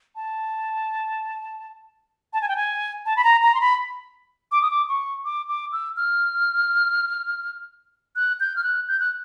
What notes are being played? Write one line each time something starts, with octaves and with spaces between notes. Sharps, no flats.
A5
A5
G#5
G5
G#5
A5
B5
A#5
A#5
C6
B5
D6
D#6
D6
C#6
D6
D6
E6
F6
F#6
G6
F6
F#6
G6
F#6